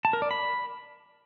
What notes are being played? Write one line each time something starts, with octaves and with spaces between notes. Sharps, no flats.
A5
A#4
D5
B5